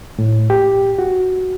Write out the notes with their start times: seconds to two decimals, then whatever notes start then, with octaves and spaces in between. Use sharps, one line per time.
0.19 A2
0.50 G4
0.99 F#4